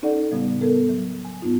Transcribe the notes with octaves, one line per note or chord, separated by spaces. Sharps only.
C#4 D#4 A4 D5 F#5
A2 C#3 G3 B3
B3 A4 A#4
F#3
G#5
G#2 B3 D#4 F4